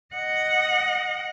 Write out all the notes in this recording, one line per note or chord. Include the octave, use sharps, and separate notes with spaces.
D#5 F#5